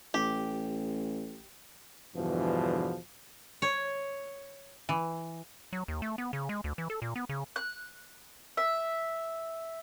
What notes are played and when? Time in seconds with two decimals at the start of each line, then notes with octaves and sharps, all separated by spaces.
0.14 A1 G4
2.15 E2 G2 B2 D3 E3 F3
3.62 C#5
4.89 E3
5.73 F#3
5.88 D#2
6.02 A3
6.18 B3
6.33 C#3
6.49 G#3
6.64 D2
6.78 E3
6.90 A4
7.02 A#2
7.16 B3
7.29 C#3
7.56 F#6
8.57 E5